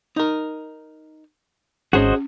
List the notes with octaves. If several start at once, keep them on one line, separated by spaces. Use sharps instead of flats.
D#4 A#4
G#1 C#4 F#4 G#4 C5 C#5 D#5 F#5